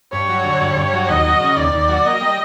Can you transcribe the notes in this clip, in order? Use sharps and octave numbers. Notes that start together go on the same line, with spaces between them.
G2 C#5
F#3
D3
G2
G2
F#3
D#2 D#5
F#3
C#3
D#2 D5
D#2
F#3
A#3 D#5
G3